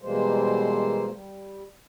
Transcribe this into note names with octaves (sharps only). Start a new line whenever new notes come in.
B2 E3 G3 G#3 A#3 C5
G3